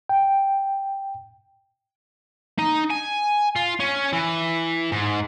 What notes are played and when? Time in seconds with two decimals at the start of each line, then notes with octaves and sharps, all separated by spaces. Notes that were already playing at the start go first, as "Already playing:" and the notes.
0.09 G5
2.59 D#4
2.90 G#5
3.56 F4
3.80 C#4
4.13 E3
4.92 G#2